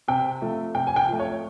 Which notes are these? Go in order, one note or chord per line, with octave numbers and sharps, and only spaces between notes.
C3 G5
F3 A3
C3 G5
G#5
G5
F3 A3
C#5